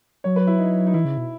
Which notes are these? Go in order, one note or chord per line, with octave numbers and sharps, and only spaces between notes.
F#3 C#5
B4
E4
D#4
D#4
E3 E4
C#3
B2